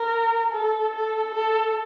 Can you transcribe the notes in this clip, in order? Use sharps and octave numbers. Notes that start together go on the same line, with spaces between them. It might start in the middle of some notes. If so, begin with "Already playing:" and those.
Already playing: A#4
A4
A4
A4